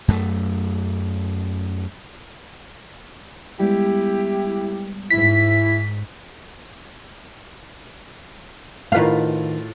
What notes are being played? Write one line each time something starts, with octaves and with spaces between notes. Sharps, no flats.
F#2 A3
G3 G#3 B3 E4 G4
G#2 E4 B6
A2 D#3 F4 B4 F5